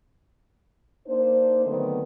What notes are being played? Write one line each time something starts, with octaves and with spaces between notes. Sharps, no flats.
A#3 D4 D#4 C5
D3 D#3 F#3 A3 B3 C4